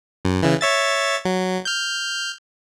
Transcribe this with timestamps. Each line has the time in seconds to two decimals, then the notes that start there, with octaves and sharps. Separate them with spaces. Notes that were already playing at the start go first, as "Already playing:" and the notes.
0.25 F#2
0.43 C#3 E3
0.61 C#5 E5 A6
1.25 F#3
1.65 F6 G6